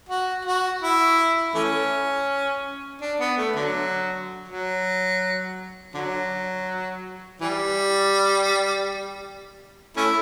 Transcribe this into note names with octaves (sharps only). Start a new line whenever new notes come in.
F#4
F#4
E4
E3 A3 C#4
D4
B3
A3
D3 F#3
F#3
D3 F#3
E3 G3
A3 C#4 E4